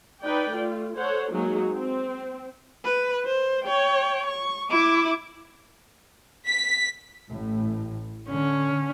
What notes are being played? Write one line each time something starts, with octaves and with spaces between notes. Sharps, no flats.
D#4 B4 D5 G5
A3 F4
A4 C5 C#5 F#5
F#3 G#3 A#3 D#4 F#4 G#4
C4
B4
C5
C#5 G5
C#6
E4 D6
B6
A1 A2
D3 C#4